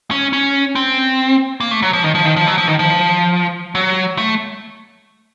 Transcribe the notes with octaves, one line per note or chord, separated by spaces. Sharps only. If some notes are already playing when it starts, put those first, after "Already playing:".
C#4
C#4
C4
A#3
A3
F#3
F3
D#3
F3
D#3
F3
F#3
F3
D#3
F3
F#3
A3